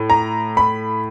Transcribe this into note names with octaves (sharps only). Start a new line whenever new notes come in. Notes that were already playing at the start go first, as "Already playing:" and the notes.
Already playing: A2
A#5
B5